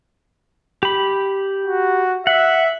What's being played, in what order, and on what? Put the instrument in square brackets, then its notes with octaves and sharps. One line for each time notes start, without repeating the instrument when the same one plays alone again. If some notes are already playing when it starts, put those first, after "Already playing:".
[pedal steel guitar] G4 B5
[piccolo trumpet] F#4
[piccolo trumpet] E5 [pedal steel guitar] F#5